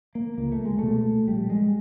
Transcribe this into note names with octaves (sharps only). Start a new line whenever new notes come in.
A#3
C#2 A#3
A3
G#3
B2 A3
A#1 G3
G#3